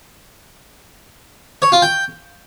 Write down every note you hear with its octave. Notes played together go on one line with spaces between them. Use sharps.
C#5
F4
G5